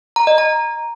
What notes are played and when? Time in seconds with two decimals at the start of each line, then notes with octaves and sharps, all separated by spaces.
0.16 A#5
0.27 D#5
0.38 A#5